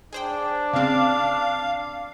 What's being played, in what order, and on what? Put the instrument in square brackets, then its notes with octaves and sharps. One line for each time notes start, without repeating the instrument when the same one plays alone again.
[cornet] D4 [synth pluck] G#4 C5 G5
[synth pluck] C#3 C4 [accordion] F5